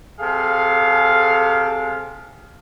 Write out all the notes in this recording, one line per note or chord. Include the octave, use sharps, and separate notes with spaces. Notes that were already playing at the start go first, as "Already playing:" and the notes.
C3 G#4 A4 F5